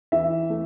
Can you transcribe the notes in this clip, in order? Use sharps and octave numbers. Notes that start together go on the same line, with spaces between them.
E3 E5
A3